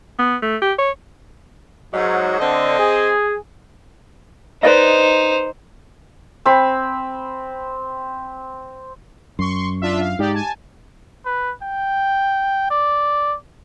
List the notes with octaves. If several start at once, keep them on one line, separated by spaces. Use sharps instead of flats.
B3
A3
G4
C#5
G#2 F#3
D3 C4 D#5
G#4
D#4 B4 C5 D5 D#5
C4 B5
F#2 C6 C#6
D4 F4 E5
F5
G#2 D#4 G4 D5
G#5 A5
B4
G5
D5